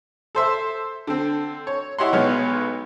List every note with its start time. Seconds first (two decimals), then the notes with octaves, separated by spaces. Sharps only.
0.35 A4 C5 E5
1.07 D3 C4
1.67 C#5
1.98 E4 G4 C#5 D#5 F#5 C6
2.12 B1 G#3 B3 C#5 F6